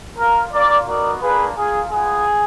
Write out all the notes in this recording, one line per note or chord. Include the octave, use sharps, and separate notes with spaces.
A#3 F4 A#4
A#3 F4 A#4 D5
B3 D#4 F#4 A#4 D5
A#3 D4 F4 G#4 B4
A#3 F4 G#4
G#3 B3 F4 G#4